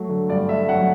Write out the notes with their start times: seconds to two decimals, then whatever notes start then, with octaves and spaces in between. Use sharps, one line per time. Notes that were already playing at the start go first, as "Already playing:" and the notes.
Already playing: F#3 A3
0.09 D3
0.29 G2 D5
0.49 A3 E5
0.68 F#3 F#5